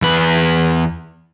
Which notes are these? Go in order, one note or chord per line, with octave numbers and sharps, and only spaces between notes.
E2 B4